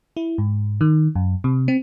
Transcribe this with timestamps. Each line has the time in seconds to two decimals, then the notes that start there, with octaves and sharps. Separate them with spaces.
0.17 E4
0.38 G#2
0.81 D#3
1.15 F#2
1.44 C3
1.68 C4